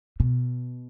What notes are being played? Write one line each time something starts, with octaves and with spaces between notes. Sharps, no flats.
B2